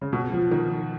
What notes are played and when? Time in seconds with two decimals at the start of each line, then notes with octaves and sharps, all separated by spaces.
0.01 C#3
0.13 B2
0.32 F3
0.51 D#3